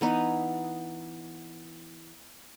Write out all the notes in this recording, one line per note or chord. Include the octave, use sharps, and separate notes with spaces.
E3 B3 D#4